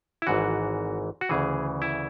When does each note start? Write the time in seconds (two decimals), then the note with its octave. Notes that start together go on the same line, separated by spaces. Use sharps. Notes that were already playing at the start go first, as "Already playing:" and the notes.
0.22 E4
0.27 G#1 G#2 E3 F#4
1.21 F#4
1.29 D2 C#3 E3 G#4
1.82 E4